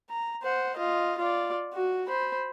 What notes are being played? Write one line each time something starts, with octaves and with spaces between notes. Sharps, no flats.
A#5
C5 F#5
F4 D#5
F4 D5
F#4
C5 B5